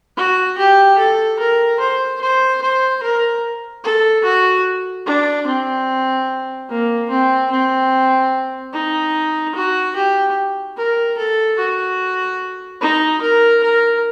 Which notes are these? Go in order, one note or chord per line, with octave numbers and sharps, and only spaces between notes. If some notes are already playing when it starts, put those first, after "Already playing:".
F#4
G4
A4
A#4
C5
C5
C5
A#4
A4
F#4
D4
C4
A#3
C4
C4
D#4
F#4
G4
A#4
A4
F#4
D#4
A#4
A#4